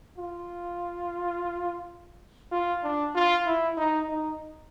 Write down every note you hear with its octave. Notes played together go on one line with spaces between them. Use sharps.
F4
F4
D4
F4
E4
D#4
D#4